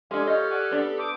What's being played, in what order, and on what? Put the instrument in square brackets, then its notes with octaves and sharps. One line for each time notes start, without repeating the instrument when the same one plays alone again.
[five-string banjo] G#3 D4 [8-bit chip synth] G4 A4 [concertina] F5 G#5
[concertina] F4 C5 C#5 [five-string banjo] D#5 [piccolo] F6
[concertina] D5 F#5 G#5
[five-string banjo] B3 D4
[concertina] B4
[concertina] A4 C5 D#6 [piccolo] D6